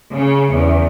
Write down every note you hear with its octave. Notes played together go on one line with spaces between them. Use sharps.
C#3
E2